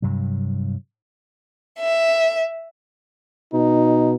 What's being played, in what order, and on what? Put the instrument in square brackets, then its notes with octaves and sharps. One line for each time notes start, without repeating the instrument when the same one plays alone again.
[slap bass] G2 C3 F#3
[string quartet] E5
[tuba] B2 [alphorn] D#4